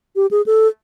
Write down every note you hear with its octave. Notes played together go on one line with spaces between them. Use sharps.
G4
G#4
A4